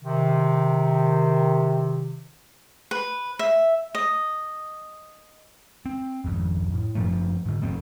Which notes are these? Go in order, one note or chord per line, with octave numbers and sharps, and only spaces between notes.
C3 D#3
B4
E5
D#5
C4
G#1 F2
A2
F#2 F3 A3
G#2 D3
E1 F2 A3 C4